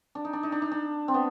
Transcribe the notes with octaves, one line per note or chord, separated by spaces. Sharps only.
D4
D#4
D4
D#4
D4
D#4
D4
C4
B3